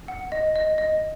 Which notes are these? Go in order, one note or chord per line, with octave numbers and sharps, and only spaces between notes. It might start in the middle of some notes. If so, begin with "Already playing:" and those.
F#5
D#5
D#5
D#5